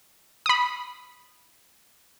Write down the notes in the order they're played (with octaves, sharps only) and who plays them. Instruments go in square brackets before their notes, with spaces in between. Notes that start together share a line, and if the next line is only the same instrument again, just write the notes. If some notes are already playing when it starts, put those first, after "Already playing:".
[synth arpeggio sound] B5 D#6